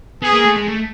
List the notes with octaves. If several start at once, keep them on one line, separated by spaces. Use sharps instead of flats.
B3 G#4
A#3
A3
G#3
A3